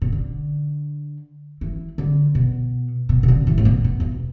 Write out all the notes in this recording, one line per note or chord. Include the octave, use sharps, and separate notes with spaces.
B2
D3
E3
D3
B2
B2
B2
D3
E3
A2
B2
B2
E2